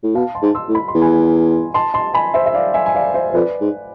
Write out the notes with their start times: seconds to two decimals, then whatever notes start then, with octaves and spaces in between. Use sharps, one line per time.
0.03 A2
0.15 B2 F5 A5
0.35 A5 C6
0.42 G#2
0.55 C6 E6
0.69 A2
0.75 B5
0.88 C6
0.95 E2
1.02 G#5 B5
1.74 A5 C6
1.94 A5 C6
2.14 G#5 B5
2.34 C5 E5
2.46 E5
2.54 D5 F5
2.74 E5 G#5
2.86 G#5
2.95 D5 F5
3.14 C5 E5
3.30 C5
3.34 F2 B4 D5
3.61 G#2